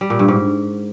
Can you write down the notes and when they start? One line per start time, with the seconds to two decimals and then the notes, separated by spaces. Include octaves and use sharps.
0.01 G3
0.10 A#2
0.19 G2
0.28 G#2